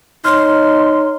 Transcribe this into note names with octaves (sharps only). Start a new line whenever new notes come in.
D#4 C#5 C6 F6